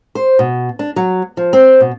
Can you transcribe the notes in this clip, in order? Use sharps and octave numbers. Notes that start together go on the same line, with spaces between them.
C5
B2
D4
F#3
F3
C4
B2